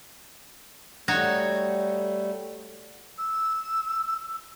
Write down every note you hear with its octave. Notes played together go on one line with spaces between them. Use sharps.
G3 A3 D#4 F#4 C#5
E6